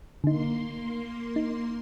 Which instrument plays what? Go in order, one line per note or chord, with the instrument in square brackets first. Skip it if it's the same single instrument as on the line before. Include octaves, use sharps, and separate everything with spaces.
[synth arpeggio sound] D3 D#4 [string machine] A#3 C6
[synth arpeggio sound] D#4